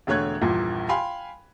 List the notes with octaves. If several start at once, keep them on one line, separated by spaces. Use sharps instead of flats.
E1 D3 A3 C#5 F#6 G#6
A#1 E2 G2 A#2
F5 G5 G#5 B5 C6